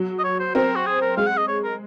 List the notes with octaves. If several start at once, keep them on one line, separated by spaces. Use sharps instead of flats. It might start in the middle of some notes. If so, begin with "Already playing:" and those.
Already playing: F#3
D#5
C#5
C5
C4 A#4
F#4
G#4
A#4
G#3 F5
F#5
D#5
C#5
A#4